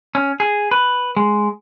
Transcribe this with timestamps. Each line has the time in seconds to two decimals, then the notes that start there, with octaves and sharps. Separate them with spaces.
0.15 C#4
0.40 G#4
0.71 B4
1.17 G#3